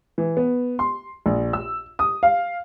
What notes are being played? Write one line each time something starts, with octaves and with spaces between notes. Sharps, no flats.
E3
B3
C6
A#1
E6
D#6
F5